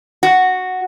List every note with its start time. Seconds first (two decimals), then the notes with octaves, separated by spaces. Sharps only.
0.23 F#4